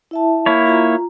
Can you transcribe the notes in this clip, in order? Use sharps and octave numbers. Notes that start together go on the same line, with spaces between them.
E4 E5 A5
A#3 E4 C#5
F4 A#5